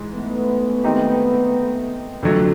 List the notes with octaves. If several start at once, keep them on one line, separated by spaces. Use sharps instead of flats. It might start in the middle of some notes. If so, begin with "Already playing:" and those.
Already playing: G#2 E3 G#3
A3 B3
D#3 G#3 C4 D#4 G4
F2 D3 F#3 A3